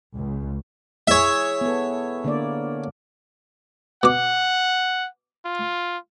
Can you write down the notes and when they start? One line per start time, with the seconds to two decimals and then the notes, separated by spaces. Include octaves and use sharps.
0.14 C#2
1.08 E4 G#4 C#5 E5
1.61 B3 A4
2.24 D3 A#3 D5
4.03 B2 F#5 D6
5.45 F4